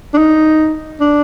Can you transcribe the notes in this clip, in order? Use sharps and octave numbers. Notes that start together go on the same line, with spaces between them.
D4
D#4
D4